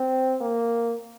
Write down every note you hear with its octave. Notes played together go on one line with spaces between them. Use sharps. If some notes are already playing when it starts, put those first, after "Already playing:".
Already playing: C4
A#3